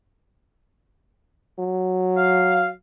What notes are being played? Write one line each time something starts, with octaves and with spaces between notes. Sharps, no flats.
F#3
F5